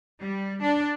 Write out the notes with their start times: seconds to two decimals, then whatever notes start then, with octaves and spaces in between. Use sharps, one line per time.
0.21 G3
0.63 D4